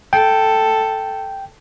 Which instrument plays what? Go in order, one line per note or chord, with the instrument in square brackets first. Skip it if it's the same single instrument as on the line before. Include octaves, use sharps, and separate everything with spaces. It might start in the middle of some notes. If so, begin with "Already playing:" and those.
[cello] A4 [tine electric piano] G5